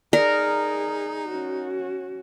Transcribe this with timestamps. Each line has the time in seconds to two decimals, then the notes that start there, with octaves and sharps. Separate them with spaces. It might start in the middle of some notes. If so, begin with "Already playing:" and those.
0.13 D#4 G#4 A#4 D5
1.29 C#4 F#4